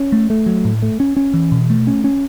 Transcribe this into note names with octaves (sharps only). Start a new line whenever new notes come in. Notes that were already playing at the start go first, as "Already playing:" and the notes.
Already playing: C#4
A3
A3
F#3
A2
A3
C#4
C#4
E3
B2
A3
C#4
C#4